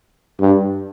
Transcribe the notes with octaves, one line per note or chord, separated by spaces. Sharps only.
G2